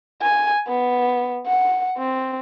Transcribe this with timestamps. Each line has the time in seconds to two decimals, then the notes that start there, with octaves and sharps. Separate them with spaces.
0.22 G#5
0.68 B3
1.47 F#5
1.98 C4